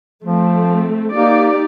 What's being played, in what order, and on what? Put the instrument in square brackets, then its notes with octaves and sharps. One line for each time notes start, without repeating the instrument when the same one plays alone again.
[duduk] F3 [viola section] A3 C4
[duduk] A#3 [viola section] D#4 G4 D5